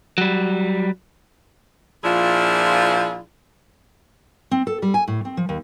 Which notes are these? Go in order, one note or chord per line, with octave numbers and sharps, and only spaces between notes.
F#3 G3
A#2 F3 D4 E4 F4 G#4
C4
A4
G3
G#5
A2
C4
F3
D#2